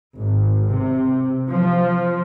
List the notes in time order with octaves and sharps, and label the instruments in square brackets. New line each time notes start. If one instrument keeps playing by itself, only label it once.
[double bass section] G#1
C3
F3